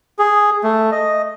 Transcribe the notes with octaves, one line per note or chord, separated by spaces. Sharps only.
G#4
A3
D#5